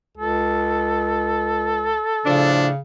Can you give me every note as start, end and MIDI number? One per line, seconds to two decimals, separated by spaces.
0.17 1.99 37
0.17 2.72 69
2.26 2.70 45
2.26 2.78 49
2.26 2.70 53
2.26 2.70 62